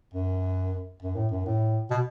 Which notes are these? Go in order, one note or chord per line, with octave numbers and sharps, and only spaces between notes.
F#2
F#2
A2
F#2
A2
B2